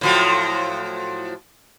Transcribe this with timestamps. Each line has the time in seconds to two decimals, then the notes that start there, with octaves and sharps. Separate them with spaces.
0.01 A2 F3 F#3